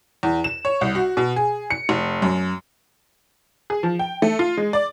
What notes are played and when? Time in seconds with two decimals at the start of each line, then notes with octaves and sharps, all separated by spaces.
0.23 E2
0.44 E7
0.65 C#5
0.81 C2
0.95 F#4
1.17 B2
1.36 G#4
1.70 C#7
1.89 F1
2.22 F#2
3.70 G#4
3.83 F3
3.99 G5
4.22 A3
4.39 F4
4.57 G#3
4.73 D5